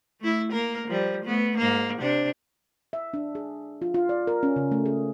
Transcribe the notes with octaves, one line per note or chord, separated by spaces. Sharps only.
A3 E4
A#3 A#4
F3 G3
A3 B3
G#2 A#3
C3 D4
E5
D4
G#4
F4
F4
D5
A#4
C#4
C#3
A3
G#4